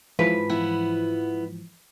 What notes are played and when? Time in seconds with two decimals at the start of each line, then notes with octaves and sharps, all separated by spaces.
0.19 G#2 E3 F3 B4
0.49 B3 E4 F#5